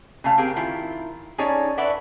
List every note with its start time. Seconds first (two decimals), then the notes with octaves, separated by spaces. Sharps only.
0.24 C#3 A3 F5
0.38 C4 G4 G#4 A#4
0.56 D#3 E4 F4
1.38 C#4 D#4 G#4 A4 C#5 D5
1.78 A4 B4 C#5 D5 E5 F#5